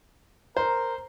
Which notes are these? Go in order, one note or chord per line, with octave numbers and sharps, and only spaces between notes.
A#4 C5